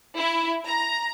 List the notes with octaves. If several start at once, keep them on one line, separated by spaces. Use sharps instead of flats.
E4
A#5